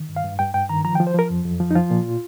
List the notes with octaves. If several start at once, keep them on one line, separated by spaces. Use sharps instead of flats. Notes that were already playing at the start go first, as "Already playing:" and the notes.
Already playing: D#3
G2
F5
G2
G2 G5
G2 G5
D#3 A#5
F3 A#5
G5
F3
C5
F3 A#4
F2
F2
F3
D#4
F3 F4
A#2